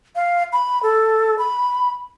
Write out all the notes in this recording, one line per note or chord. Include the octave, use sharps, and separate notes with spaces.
F5
B5
A4
B5